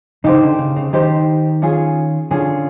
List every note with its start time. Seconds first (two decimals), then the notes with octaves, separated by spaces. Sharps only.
0.24 C#3 D#4 G4 C5
0.41 D3
0.59 C#3
0.76 C#3
0.93 D#3 D#4 G4 C5
1.62 C#4 F4 G#4
2.31 D3 C#4 F4 G#4